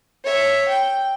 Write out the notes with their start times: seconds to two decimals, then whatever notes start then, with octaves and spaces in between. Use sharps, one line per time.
0.25 C#5 E5
0.68 G5